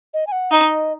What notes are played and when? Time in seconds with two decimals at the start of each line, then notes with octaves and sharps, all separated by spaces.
0.14 D#5
0.27 G#5
0.32 F#5
0.51 D#4 D#5